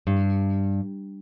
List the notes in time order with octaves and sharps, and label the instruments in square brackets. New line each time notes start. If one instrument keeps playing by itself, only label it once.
[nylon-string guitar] G2